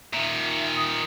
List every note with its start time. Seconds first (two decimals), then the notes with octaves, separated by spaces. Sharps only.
0.13 A#2 D#3 E5
0.76 D#6